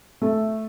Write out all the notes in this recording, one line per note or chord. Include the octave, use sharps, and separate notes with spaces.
A3